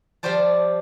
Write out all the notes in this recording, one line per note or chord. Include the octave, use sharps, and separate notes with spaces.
F3 G3 G4 C5 D5 A5